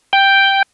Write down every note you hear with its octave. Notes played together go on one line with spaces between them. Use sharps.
G5